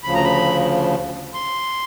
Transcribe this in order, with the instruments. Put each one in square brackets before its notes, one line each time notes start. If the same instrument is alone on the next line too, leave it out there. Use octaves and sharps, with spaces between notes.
[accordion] D2 C#3 F3 B5
A#5
B5
C6